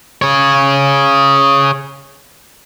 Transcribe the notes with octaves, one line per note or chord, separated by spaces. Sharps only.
G#4 C#5